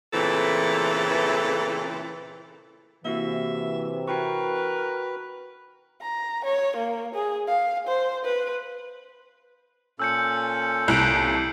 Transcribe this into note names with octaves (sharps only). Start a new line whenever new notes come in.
A#2 C#3 E3 A3 C4 A4
C3 E3 A#3 E4 F#4 E5
F#4 A#4 B4 G5 C#6
A#5
C#5
A#3
G#4
F5
C5
B4
A#2 C#4 A4 E6 G6 C#7
C2 D7 F#7